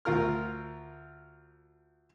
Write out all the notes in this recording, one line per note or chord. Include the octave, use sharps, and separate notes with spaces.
D2 F4 A#4 F6